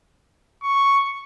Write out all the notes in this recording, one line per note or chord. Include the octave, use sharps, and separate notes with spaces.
C#6